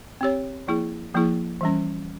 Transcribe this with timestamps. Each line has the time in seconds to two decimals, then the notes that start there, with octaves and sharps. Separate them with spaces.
0.21 C4 G4 C#5
0.67 F3 A#3 E4 G#4
1.14 F3 A#3 E4 G#4
1.61 E3 G3 C#4